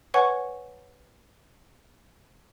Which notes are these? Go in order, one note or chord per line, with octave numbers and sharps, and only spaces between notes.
B4 C#5 F#5 G#5 C#6